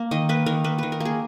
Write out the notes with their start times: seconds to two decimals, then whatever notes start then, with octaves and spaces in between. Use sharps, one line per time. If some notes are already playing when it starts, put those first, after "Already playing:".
Already playing: A#3
0.11 D#3 D#5
0.29 A#3 B4
0.46 D#3 A#4
0.64 A#3 B4
0.78 D#3 B4
0.92 A#4
1.00 A#3 G#4